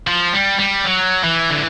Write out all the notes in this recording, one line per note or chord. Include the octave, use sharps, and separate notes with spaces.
F3
G3
G3
F#3
E3
D3